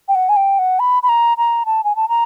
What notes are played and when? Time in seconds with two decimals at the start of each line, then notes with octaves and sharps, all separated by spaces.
0.08 G5
0.15 F#5
0.29 G#5
0.37 G5
0.59 F#5
0.80 B5
1.03 B5
1.09 A#5
1.38 A#5
1.66 A5
1.84 G#5
1.96 A5
2.09 A#5